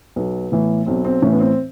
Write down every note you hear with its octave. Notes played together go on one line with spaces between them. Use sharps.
B1 B3
A2 E3
B1 C4
C4
A2 E3 C#4
B3
C4